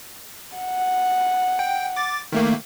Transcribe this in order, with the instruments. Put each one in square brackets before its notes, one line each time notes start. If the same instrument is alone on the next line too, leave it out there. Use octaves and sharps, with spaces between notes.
[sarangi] F#5
[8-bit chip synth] G5
D6 A6
D#3 A3 A#3